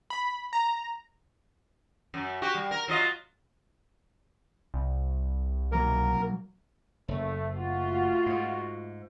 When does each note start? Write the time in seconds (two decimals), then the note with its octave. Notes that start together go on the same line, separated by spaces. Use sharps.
0.10 B5
0.53 A#5
2.14 F#2
2.42 F#4 G4
2.55 G3
2.71 A#4
2.88 F#3 F4 D#5
4.74 C2
5.72 B1 F#3 A#3 A#4
7.08 F#1 A3
7.53 A3 F4 F#4
8.26 G#2